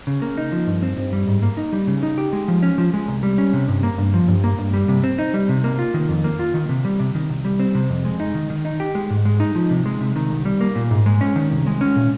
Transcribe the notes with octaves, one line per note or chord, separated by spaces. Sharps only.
C#3
A#3
D#4
F3
G2
C4
G2
G3
G#2
A#3
D#4
G3
C#3
D#4
G4
G#3
F3
C#4
F3
G#3
C2
G3
C#4
C3
G2
A#3
G2
F3
G2
A#3
G2
G3
C3
C4
D#4
G3
C3
A#3
F4
D#3
F2
A#3
F4
D#3
C3
G3
C3
D#3
C2
G3
C4
C3
F2
G#3
D#4
D#3
D#3
D#4
G4
G#3
G#2
G#3
D#4
F3
C3
G#3
C3
D#3
C2
G3
A#3
A#2
G#2
G#3
C#4
D#3
C2
G#3
C#4
A#2